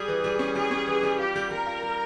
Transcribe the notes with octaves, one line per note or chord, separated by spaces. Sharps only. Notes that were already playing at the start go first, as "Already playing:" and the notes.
Already playing: G3 G#4
E3
G3
C#4
G3 G#4
C#4
E3
G3
F4 G4
G3
G3 A#4
F4
G3